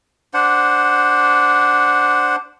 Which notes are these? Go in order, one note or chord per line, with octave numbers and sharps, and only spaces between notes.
D4 C5 F#5